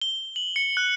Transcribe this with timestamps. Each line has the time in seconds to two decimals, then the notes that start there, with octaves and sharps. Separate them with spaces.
0.02 G7
0.36 F#7
0.56 C#7
0.77 F#6